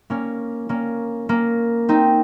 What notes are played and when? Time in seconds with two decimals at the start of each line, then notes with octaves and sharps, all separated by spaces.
0.10 A#3 C#4
0.69 A#3 C#4
1.29 A#3 C#4
1.89 C4 D#4